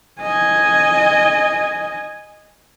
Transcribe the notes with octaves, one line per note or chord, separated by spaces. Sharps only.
D#5 G#5